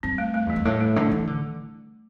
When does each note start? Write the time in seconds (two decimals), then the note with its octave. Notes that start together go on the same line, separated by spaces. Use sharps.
0.03 G2 C4
0.18 A3
0.34 A3
0.47 E2 G3
0.56 G2
0.65 A2 A3
0.80 A3
0.96 D3
1.12 E3
1.27 D3